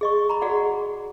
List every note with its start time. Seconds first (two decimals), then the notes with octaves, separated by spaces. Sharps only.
0.01 G#4 D#5 C#6
0.29 A#5 B5
0.42 F#4 G#4 D5 F#5